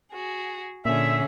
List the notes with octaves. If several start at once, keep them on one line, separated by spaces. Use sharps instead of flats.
F#4 G#4
A#2 D3 C#4 G#4 E5